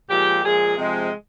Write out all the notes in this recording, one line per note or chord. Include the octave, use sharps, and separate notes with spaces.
A#2 F3 G#3 G4
A#2 F3 G#3 G#4
C3 F3 G#3